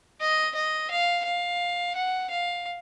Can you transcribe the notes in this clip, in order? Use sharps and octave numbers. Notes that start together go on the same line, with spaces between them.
D#5
D#5
F5
F5
F#5
F5